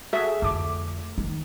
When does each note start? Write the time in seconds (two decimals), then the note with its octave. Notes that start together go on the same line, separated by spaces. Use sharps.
0.13 F#4 G#4 A4 E5
0.42 F2 D3 A3 D6
1.18 D#3